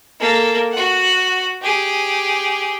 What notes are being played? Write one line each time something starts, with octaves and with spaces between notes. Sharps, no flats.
A#3 A4
F#4 F#5
G4 G#4